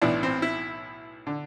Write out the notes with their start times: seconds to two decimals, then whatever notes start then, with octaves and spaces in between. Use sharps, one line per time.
0.01 B1 A2 E3 D4
0.23 C4
0.42 E4
1.27 D3